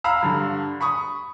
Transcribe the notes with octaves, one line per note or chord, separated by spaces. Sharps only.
F5 A#5 B5 E6
G2 D3
B5 C#6 D#6